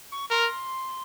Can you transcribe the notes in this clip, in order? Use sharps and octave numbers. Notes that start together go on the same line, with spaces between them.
C#6
A#4 C6